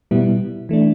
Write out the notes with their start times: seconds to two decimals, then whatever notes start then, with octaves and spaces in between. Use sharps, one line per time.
0.11 B2 G3 B3 E4
0.69 E3 A3 D4